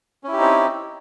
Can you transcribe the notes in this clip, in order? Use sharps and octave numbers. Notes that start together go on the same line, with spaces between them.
C4 C#4 D#4 E4 G4